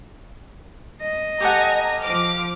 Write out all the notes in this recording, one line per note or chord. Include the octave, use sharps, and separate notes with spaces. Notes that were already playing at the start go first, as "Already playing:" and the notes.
D#5
G4 A4 F#5 G#5 A#5
F3 D6 F6